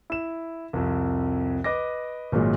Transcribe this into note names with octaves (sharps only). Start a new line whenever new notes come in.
E4 E7
C2 F2
B4 D#5 D6 A#6
G#1 A#2 F#3 G#3